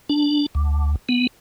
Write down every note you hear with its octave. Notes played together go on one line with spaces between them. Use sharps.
D4
D2
B3